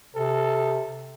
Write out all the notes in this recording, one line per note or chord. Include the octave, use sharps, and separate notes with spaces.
C3 A4